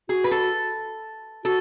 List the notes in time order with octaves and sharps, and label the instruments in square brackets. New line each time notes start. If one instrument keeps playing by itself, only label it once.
[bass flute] F#4 [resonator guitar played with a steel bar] G#4
[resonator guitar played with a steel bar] B4
A4
[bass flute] F#4 [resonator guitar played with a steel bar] A4